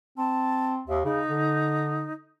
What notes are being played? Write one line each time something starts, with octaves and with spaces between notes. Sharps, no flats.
C4 A5
D#2 E5
C#3 D#4
D3